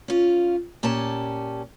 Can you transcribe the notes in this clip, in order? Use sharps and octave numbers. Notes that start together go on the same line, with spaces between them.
C#4 F4
A#2 C#4 G4 A5